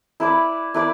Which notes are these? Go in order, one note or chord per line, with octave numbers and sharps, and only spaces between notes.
E4 B4 D5
E4 B4 D5